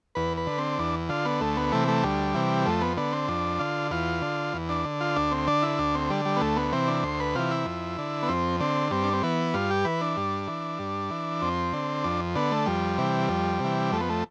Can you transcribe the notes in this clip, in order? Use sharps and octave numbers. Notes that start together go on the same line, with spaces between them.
E2 B4
B4
D3
C4
E2 D4
D3 F4
B3
D2 A3
B3
C3 E3 A3
A3
D2 G3
C3 E3
F2 A3
B3
D3 B3
C4
F2 D4
D3 F4
E2 F4
D3
E2
D4
D3
F4
D2 D4
C4
D3 D4
E4
D2 D4
C4
D3 G3
G3
B3
D2 A3
B3
C3 E3 C4
D4
D2 C5
B4
C3 E3 F4
E4
F2
D3
B3
F2 C4
D3 C4
G2 C4
D4
C4
E3 B3
G2 F4
G4
E3 B4
D4
G2
E3
G2
E3
F2 C4
D3
F2 D4
D3 B3
A3
F2 G3
C3 E3
F2
C3 E3
F2 A3
B3
A3